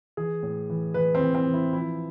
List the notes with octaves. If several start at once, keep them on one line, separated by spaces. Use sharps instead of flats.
E3 G#4
A2
E3
E3 B4
C4
E3
C4
E3
E4
F3 E4